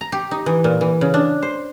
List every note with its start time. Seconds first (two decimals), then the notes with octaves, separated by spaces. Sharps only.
0.01 A#5
0.12 G4
0.31 D#4
0.46 E3
0.64 A#2
0.81 E3
1.01 C#3
1.14 D4
1.43 C5